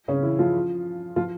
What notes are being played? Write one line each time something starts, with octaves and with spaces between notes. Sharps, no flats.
C#3 C#4
E3 E4
F3 F4
F3 F4